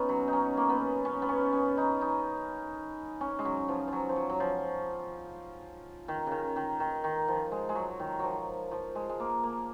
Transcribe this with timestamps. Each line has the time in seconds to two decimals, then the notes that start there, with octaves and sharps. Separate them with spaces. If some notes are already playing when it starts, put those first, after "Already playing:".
Already playing: B3 C#4 D#4
0.09 F#3
0.28 D#4
0.33 C#4
0.57 A#3
0.69 B3
1.05 C#4
1.22 B3
1.29 C#4
1.53 C#4
1.77 D#4
2.01 D#4
3.21 C#4
3.39 G#3
3.45 F#3
3.68 F3
3.88 F3 F#3
4.09 F3
4.16 F#3
4.30 F#3
4.40 F3
6.08 D#3
6.26 C#3
6.32 D#3
6.56 D#3
6.80 D#3
7.04 D#3
7.28 F3
7.52 G#3
7.69 G#3
7.75 F#3
7.99 D#3
8.19 F3 F#3
8.71 F3
8.95 G#3
9.09 G#3
9.20 A#3
9.44 A#3